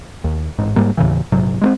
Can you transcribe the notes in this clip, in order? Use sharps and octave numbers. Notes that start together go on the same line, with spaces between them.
D#2
A1 G#2
G#2 G3 A#3
D#2 A2 C#3 E3
A#1 G#2 C3 F#3
G#3 A#3 C4